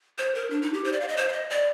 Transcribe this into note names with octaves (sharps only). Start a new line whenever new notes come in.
C5
A#4
D4
D#4
G4
C5
D5
F5
D#5
C5
F5
D#5
D5